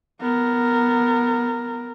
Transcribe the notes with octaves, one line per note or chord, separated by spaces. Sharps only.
B3 A#4